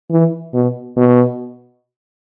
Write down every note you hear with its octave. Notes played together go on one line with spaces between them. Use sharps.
E3
B2
B2